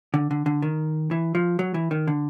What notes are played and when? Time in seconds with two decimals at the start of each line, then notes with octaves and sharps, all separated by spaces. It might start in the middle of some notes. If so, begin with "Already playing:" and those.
0.14 D3
0.31 D3
0.46 D3
0.62 D#3
1.11 E3
1.35 F3
1.59 F#3
1.74 E3
1.91 D#3
2.07 D3